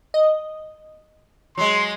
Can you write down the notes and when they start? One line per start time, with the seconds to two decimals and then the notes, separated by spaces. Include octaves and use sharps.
0.14 D#5
1.58 F#3 G#3 C6